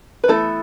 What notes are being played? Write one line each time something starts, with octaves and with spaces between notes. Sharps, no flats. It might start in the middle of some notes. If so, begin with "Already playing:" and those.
B4
E3 A3 B3 E4 A4